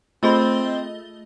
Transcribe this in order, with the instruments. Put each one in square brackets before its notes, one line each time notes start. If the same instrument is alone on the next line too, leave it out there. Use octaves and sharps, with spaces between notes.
[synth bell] A3 D#5 G7 [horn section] C4 [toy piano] F4 G#4 B5